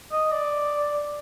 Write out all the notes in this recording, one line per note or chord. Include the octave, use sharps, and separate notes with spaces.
D#5
D5